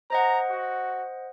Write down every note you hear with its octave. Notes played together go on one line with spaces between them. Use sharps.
C5 D#5 F#5 A#5
F#4